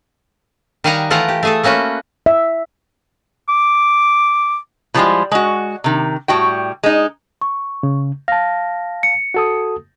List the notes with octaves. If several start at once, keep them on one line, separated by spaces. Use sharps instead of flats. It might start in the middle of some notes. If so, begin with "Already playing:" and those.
D#3 G3 F5 F#5 G#5 A#5
E3 A3 F4 A#4 F#5 A#5
G4
A3 G#4 A4
A3 A#3 C#4 F#4 B4
E5
D6
B2 F3 G3 G#3 E4 F4
G#3 F#4
C3 D#3
A2 G3 F#4 G5
G#3 D#4
C#6
C#3
F5 A5 A#6
C#7
F#4 A4 D#6